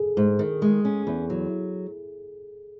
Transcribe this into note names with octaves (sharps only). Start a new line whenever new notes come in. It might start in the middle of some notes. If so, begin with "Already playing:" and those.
Already playing: G#4 A4
G#2
D#3
G#3
C#4
E2
F#3